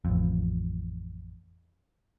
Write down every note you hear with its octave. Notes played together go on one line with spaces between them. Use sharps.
A1 F2